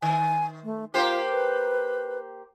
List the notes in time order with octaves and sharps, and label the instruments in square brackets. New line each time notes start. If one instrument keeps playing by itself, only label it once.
[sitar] D#3 [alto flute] G#5
[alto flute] A3
[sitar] A#3 G4 C5 [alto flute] F4
[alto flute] B4